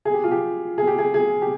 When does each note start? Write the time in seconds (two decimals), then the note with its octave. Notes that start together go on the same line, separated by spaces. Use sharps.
0.05 G#4
0.14 G4
0.24 F4
0.31 G4
0.78 G#4
0.87 G4
0.98 G#4
1.14 G#4
1.42 G4